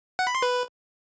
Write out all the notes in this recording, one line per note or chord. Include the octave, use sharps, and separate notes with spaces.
F#5
B5
C6
B4